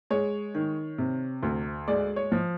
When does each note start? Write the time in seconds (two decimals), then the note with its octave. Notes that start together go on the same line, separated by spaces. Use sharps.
0.10 G#3 C#5
0.55 D#3
0.98 C3
1.43 D2
1.88 G#3 D5
2.16 C#5
2.32 F3